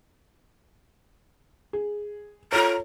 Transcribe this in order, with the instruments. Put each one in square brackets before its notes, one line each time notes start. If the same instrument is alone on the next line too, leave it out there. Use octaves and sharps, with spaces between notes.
[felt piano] G#4
[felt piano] F4 A4 C#5 [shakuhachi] A#5